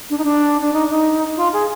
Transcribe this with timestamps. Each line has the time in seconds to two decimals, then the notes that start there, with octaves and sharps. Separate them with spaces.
0.10 D4
0.18 D#4
0.24 D4
0.61 D4
0.73 D#4
0.89 D#4
1.37 F4
1.52 G#4